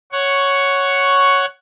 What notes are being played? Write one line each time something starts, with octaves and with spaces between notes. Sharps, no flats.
C#5 F#5 C#6